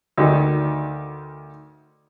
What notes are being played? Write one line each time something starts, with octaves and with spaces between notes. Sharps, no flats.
D2 D#3